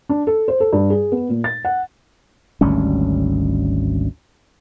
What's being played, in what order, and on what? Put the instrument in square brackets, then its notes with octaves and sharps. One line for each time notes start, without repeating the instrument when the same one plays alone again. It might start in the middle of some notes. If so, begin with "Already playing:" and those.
[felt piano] D4
A4
C5
A4
G2
G#4
B3
A#2
A6
F#5
[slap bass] G#1 D2 G3 C#4